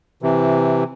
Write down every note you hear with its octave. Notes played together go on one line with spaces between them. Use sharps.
C3 E3